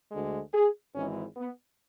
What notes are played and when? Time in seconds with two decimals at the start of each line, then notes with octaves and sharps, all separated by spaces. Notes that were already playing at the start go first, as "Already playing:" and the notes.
0.11 D2 D3 G#3
0.53 G#4
0.95 G#1 G#2 E3 G#3 C#4
1.36 B3